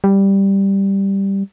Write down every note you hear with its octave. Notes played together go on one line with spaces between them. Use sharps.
G3